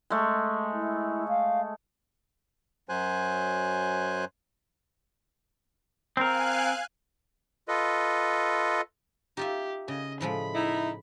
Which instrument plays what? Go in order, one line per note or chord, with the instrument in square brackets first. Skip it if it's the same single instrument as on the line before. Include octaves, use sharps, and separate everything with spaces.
[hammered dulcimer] G#3 A3
[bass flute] E4
F5
[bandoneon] F#2 F#3 C5 G#5 F#6
[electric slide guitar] C4 A#4 [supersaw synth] F5 G#5 F#6
[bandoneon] F4 A4 B4 D#5
[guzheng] D#4 F4 E5 [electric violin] G4
[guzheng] C#3 [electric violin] D#5
[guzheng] A2 F3 G#3 [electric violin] B5
[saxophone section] D#4 E4